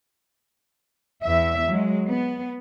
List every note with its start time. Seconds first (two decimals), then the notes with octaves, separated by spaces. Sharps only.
1.22 E2 E5
1.69 F#3 G#3
2.07 B3